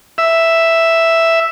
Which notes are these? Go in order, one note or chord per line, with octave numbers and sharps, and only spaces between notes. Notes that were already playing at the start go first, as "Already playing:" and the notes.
E5